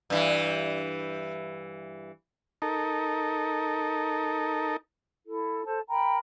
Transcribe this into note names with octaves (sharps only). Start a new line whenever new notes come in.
G2 E3
D#4 A4 A#4
E4 A4
A4 C5 A5
A#4 G5 A#5 B5